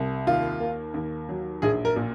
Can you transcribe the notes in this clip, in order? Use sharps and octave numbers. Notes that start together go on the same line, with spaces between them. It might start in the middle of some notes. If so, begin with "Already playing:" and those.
Already playing: C2
D#2 F4
A#3
D#2
F#3
A#1 G#4
A#4
A#2